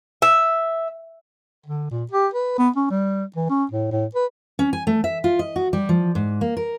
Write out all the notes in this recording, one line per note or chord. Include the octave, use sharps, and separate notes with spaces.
E5
D3
A#2
G4
B4
B3
C#4
G3
E3
C#4
A2
A2
B4
C#4
G#5
A3
E5
F4
D#5
F#4
G3
F3
G#2
A#3
A#4